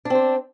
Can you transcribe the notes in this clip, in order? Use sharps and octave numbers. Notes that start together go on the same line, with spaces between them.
C4 D4 C5